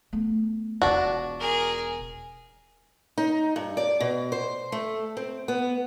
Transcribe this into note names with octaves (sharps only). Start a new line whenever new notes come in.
A3 B3
E1 D4 F4 F#4
G#4 A#4
D#4
G2
D5
B2
C5
A3
C4
B3